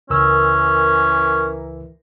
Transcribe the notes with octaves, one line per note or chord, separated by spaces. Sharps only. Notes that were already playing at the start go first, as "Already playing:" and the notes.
C#2 E3 C#4 A#4 E6